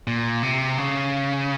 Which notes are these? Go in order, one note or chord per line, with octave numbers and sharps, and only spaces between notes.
A#2
C3
C#3